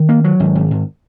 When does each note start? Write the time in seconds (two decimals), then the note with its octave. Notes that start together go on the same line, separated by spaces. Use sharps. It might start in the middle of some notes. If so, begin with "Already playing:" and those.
Already playing: D#3
0.09 A#3
0.24 F#3
0.40 G#1
0.55 G#1
0.71 G#1